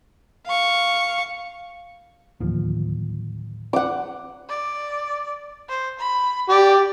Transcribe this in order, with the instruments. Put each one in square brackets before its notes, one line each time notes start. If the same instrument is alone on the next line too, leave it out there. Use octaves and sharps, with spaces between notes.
[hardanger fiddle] F5 C#6
[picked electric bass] D1 D#2 F3
[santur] F#5 D6
[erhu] D5
C5
B5
[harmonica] G4 [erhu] D5